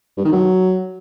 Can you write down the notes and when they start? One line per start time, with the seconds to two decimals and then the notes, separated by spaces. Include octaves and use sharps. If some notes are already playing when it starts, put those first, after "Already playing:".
0.17 G2
0.25 D#3
0.32 F#3